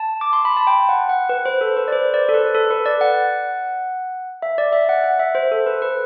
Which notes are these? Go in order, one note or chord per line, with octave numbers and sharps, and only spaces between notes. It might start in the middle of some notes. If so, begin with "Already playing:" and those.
Already playing: A5
D6
C6
B5
A5
G5
F#5
F#5
B4
C5
A4
B4
D5
C5
D5
A4
B4
A4
B4
D5
F#5
E5
D5
E5
F#5
F#5
E5
C5
A4
B4
B4